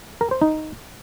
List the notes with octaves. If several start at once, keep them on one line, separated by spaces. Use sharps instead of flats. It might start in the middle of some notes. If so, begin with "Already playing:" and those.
A#4
C5
D#4